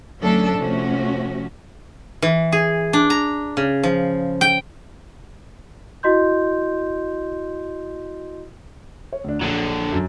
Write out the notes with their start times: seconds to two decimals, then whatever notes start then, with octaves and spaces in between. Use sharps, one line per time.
0.21 D2 F#3 A3 C#4 D4 A4
0.57 C3 F3 A3 C#4 F#4
2.22 E3
2.52 G#4
2.93 D4
3.10 A#5
3.57 C#3
3.83 F3
4.41 G5
6.03 E4 F#4 D#5 C6 G6
9.13 C#5
9.24 D2 D4
9.41 A#1 D3 F#3
9.92 F#2